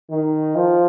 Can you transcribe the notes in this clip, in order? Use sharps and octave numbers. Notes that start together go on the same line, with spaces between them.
D#3
F3